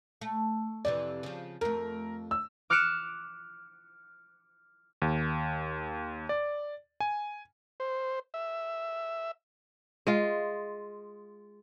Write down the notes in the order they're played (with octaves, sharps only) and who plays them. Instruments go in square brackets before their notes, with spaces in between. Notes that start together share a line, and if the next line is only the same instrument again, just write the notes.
[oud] A3
[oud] F2 C3 E3 [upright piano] D5
[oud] C#3 F3
[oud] F2 A3 [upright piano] A#4
[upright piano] E6
[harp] D6 F6 F#6 C#7 D7 E7
[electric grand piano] D#2
D5
G#5
[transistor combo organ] C5
E5
[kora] G#3 F4